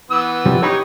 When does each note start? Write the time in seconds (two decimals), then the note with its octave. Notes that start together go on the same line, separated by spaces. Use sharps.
0.11 E3 B3 E6
0.45 C3 F3 G3
0.62 E3 D#4 G4 C#5 G5 B5